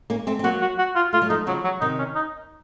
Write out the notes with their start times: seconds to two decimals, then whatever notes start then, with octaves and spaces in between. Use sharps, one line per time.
0.10 A#3 C#4
0.27 A3 C4
0.39 C4
0.44 F#3 A#3 F#4
0.61 F#4
0.78 F#4
0.96 F4
1.13 A3 F4
1.22 F#3
1.29 F3 A3 D#4
1.47 C#3 F3 F#3
1.64 F#3
1.81 C3 D#3 D#4
1.99 C#4
2.15 D#4